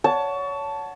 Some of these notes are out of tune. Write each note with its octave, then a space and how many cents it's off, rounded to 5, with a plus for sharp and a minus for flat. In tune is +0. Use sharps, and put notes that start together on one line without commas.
C#5 +25 F#5 -5 A5 +0